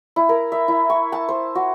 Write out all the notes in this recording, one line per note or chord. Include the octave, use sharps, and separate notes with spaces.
E4
A#4
E5
E4
C#6
A5
C5
F#4